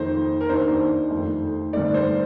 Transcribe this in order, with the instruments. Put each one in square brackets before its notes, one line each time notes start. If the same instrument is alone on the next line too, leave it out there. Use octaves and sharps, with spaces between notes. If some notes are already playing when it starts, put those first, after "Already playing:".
Already playing: [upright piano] F2 D#3 A#3 D#4 C5
A#4
D#2 D#3 A#3 D4 C5
F2 D#3 A3
G2 D3 A3 C4 D#4 D5
C5